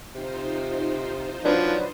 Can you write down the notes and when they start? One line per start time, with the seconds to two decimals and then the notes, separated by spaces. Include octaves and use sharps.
0.15 C3 D#4 F4 C5
1.45 F3 F#3 D4 B4